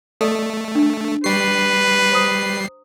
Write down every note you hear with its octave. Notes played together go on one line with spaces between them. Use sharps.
A3 A4 D5 D#5
D4
G3 G4 B4 C7
C5 A#5 D#6